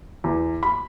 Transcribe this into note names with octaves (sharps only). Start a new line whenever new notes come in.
E2
B5